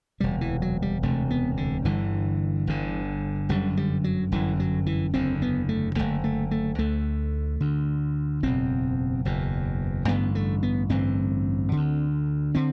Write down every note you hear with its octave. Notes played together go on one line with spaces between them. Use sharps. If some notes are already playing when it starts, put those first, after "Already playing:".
E1 D2 C3 G3
E3
F#3
G3
E1 D2 C3 A3
B3
D3
G1 G2 D3 E3
G1 G2 D3
G1 F#2 D3 G3
G3
F#3
G1 F#2 D3 E3
F#3
E3
F#1 E2 D3 C4
B3
A3
F#1 E2 D3 A3
A3
A3
D2 D3 A3
D2 D3
F#1 E2 B2 C4
F#1 E2 B2
A1 G2 D3 B3
A3
B3
A1 G2 D3 C4
D2 D3
D3 C4